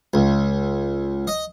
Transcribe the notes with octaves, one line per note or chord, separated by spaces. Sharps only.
C#2
D#5